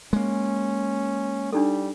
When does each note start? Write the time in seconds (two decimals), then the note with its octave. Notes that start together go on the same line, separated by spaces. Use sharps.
0.13 G#3 A#3 C#4
1.53 G3 D4 D#4 A4